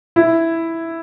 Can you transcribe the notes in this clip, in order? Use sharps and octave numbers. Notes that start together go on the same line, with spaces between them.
E4